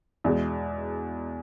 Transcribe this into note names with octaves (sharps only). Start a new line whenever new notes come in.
E2 B2 G#3